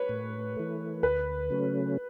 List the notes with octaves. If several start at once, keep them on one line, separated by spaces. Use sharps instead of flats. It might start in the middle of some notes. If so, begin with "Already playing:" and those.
Already playing: B4 C#5
A2
E3 A3
D2 B4
C#3 F#3 A3 C#4